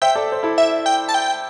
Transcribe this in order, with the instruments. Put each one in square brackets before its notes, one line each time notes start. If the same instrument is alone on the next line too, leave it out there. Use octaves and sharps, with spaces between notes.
[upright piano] C5 E5 [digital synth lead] G5
[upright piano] A4 D5
C5
E4 A4
[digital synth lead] E5
G5
A5
G5